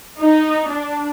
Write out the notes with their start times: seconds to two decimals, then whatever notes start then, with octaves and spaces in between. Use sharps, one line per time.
0.20 D#4
0.68 D4